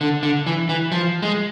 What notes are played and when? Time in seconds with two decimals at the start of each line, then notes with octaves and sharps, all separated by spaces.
0.01 D3
0.23 D3
0.47 E3
0.69 E3
0.92 F3
1.22 G#3